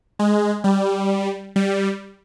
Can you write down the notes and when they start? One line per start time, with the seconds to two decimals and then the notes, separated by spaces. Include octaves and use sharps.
0.19 G#3
0.64 G3
1.56 G3